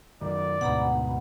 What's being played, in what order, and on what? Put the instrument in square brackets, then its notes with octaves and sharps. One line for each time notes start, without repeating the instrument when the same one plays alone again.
[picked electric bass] F#2 D#3 [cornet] D5
[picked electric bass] D2 G#2 B2 [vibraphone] F#5 A#5 B5